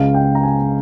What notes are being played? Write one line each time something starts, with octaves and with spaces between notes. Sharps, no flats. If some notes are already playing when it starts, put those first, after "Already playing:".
Already playing: C#2 C#3 G#3 F5
G5
A#5
G#5